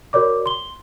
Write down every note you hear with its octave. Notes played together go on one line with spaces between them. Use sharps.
F#4 A#4 C#5 D5 D6
C6 G7